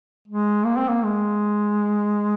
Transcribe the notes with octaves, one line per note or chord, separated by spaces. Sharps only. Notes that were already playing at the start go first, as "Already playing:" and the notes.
G#3
A#3
C4
A#3
G#3